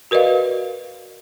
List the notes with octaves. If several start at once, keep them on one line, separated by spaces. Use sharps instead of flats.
F#4 A#4 B4 D5 D#5 F5